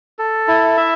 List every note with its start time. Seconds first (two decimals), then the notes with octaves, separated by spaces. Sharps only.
0.19 A4
0.48 E4
0.77 E5